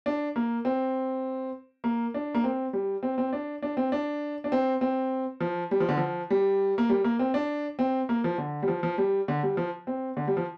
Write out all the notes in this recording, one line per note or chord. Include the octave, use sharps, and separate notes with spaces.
D4
A#3
C4
A#3
D4
A#3
C4
G3
C4
C4
D4
D4
C4
D4
D4
C4
C4
F3
G3
F3
D3
F3
G3
A#3
G3
A#3
C4
D4
C4
A#3
F3
D3
G3
F3
F3
G3
D3
G3
F3
C4
D3
G3
F3